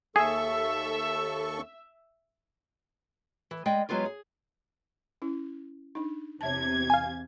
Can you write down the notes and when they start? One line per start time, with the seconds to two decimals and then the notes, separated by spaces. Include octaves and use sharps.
0.16 D#2 G#4 A4 E5 C#6
3.51 E3
3.66 G#3 D5 D#5 G5
3.89 F#3 G#3 B3 F4 G4
4.05 G#4
5.22 C#4 E4
5.95 D4 D#4
6.41 E2 C3 C#5 E5 A5 G#6
6.90 F5 G#5